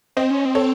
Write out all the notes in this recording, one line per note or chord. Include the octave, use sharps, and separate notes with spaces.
C4 C5 D#5
C#4
C4
A4 C#5